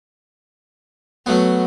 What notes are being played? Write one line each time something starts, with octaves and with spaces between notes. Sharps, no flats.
F#3 A3 B3